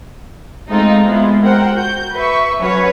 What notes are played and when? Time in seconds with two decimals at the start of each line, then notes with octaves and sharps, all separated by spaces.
0.69 G#3 A3 C4 D#4 F4
1.05 G#3 B3 E4 F4
1.43 A#4 C5 F#5 G5
1.74 F#4 G6
2.15 B4 E5 C#6
2.60 F#3 C#4 F#4 B4 C#5 F#5